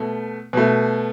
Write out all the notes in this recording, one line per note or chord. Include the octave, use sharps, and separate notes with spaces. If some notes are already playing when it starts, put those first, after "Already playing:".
Already playing: B2 A3
B2 A3